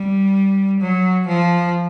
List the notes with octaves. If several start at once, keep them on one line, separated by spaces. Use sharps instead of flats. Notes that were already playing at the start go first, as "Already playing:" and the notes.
Already playing: G3
F#3
F3